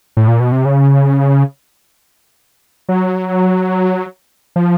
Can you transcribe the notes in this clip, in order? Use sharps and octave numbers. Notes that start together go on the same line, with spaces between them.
A2
A#2
B2
C3
C#3
F#3
F3